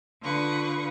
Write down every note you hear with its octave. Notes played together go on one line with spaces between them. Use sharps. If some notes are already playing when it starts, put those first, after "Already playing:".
D3 F4 B4 C#6 D#6